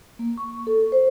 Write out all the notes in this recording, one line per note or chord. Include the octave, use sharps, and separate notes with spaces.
A#3
C#6
A4
C5